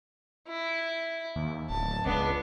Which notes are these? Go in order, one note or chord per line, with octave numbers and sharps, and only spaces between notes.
E4
D#2
D1 A5
C#2 B3 D4